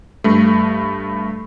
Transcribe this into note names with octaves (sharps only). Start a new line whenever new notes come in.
G2 A3